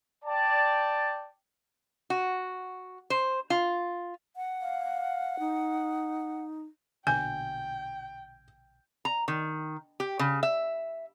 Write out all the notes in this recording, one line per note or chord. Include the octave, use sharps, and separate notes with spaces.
D5 G5 A5
F#4
C5
F4
F#5
F5
D#4
A#1 B2 D3 G5 G#5 G6
A#5
D#3
G4
C#3
E5